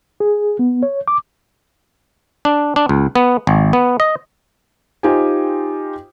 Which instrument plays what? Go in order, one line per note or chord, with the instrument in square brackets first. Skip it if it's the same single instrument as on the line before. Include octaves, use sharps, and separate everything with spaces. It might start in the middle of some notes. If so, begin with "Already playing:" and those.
[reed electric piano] G#4
B3
C#5
D6
[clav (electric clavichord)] D4
D4
C#2
B3
G#1
B3
D#5
[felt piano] D#4 F4 G4 C5 G5 G#5